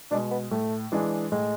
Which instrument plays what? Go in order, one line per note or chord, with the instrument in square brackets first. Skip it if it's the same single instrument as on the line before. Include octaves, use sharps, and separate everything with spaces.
[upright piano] B2 G#3 [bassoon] D4
[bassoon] B3
[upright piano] A2 [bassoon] A3
[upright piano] E3 G#3 D4 G#4
[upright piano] A2 [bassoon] G#3